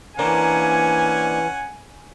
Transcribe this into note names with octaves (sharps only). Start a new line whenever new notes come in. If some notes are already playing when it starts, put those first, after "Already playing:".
E3 A#3 C#4 D4 C5 F#5 G#5